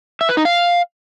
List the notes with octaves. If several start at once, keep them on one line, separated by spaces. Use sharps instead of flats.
E5
B4
D#4
F5